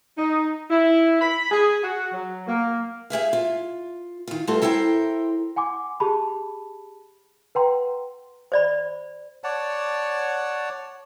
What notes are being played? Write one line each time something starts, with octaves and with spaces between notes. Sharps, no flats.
D#4
E4
B5
G#4
F#4
F#3
A#3
G4 G#4 E5 F5
F4
D#3 F4
G3 A3 B3 F4 F#4 A4
E4 A4 A#4 C5 G5
F#5 G#5 C6 D6
G4 G#4 A5 B5
B4 F#5 G5 A#5 C6
C5 D5 B5
C#5 D5 F#5 A5